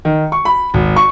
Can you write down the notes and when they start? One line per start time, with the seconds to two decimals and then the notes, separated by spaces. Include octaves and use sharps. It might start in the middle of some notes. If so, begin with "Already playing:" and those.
0.05 D#3
0.32 C#6
0.45 B5
0.74 G#1
0.96 C#6